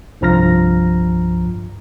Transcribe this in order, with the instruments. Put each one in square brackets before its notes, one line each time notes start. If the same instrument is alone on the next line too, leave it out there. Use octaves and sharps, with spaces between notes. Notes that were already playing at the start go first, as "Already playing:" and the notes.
[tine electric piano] C2 G2 F3 A#5 F6 A#6